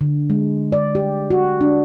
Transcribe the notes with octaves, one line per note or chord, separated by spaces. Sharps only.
D3
G#3
D5
G4
F#4
D4